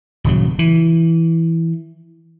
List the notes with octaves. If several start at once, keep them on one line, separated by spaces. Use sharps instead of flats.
D#1 C#3 F#3
E3